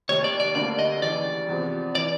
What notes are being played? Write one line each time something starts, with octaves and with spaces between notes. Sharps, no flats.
F1 D#2 D#3 C#5
D5
D5
D2 D3 G3 A#3 D4 D5
D#5
D#2 C#3 E3 D5
E2 C3 F3
E3 D5